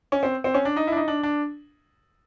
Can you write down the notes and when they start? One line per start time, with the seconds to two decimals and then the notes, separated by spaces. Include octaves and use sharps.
0.12 C#4
0.23 C4
0.44 C4
0.54 C#4
0.65 D4
0.76 D#4
0.87 D4 E4
0.97 D#4
1.08 D4
1.23 D4